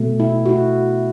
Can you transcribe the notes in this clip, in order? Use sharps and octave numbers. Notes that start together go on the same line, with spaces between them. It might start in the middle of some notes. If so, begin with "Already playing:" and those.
Already playing: B2 A3
E4
F#4
E4